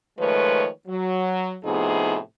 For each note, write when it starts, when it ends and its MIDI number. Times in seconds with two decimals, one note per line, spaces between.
0.18 0.67 51
0.18 0.67 53
0.18 0.67 56
0.18 0.67 57
0.18 0.67 71
0.18 0.67 73
0.88 1.55 54
1.64 2.17 45
1.64 2.17 48
1.64 2.17 53
1.64 2.17 59
1.64 2.17 63
1.64 2.17 68